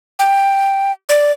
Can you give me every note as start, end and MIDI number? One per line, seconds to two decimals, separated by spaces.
0.19 0.92 79
1.09 1.32 74